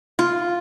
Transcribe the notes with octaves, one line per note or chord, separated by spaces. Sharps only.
F4